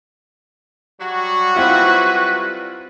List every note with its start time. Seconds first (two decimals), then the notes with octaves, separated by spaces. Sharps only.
1.01 F#3 G3 F#4
1.56 C4 E4 F4 B4